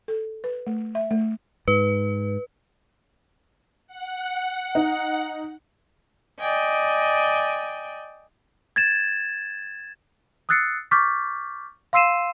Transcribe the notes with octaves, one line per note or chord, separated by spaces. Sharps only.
A4
B4
A3
E5
A3
G#2 B4
F#5
D#4
D5 D#5 G5 G#5
G#6 A6 E7
D#6 E6 F#6 A6 C7 C#7
C#6 D6 F6 G6 A6 B6
F5 C6 E6 C7 D#7 E7